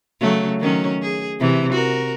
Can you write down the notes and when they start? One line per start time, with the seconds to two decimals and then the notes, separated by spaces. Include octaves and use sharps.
0.20 C#3 F#3 A3
0.60 D#3 F#3 C#4
1.02 G#4
1.39 C3 E3
1.72 F#4 A#4